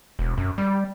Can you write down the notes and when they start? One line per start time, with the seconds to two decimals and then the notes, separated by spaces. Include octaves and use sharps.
0.19 E1
0.38 F#2
0.58 G3